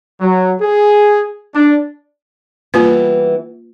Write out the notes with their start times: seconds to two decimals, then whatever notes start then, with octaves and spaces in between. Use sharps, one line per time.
0.21 F#3
0.61 G#4
1.55 D4
2.74 E3 G3 A#3 B3 F4 B4